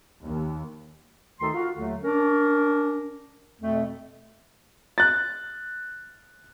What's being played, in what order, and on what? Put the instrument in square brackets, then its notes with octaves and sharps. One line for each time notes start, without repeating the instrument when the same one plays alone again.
[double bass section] D#2
[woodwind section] D2 D#3 D#4 A4 C6
F4 F#4 F5
D#2 D3 F#3 A3
C#4 D4 A#4
F2 B2 A3
[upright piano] F#6 A6